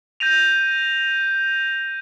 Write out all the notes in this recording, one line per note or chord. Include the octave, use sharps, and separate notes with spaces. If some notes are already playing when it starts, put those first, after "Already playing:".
G6 A#6 D#7 F7